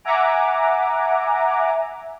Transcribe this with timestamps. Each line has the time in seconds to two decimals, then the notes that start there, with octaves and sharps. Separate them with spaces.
0.04 E5 F#5 G#5 A#5 D6